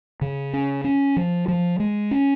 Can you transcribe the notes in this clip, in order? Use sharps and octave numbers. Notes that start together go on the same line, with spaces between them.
C#3
C#4
C#4
F3
F3
G#3
C#4